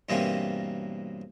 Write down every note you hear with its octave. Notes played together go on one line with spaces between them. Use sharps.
G2 B2 E3 A#3 C4 C#4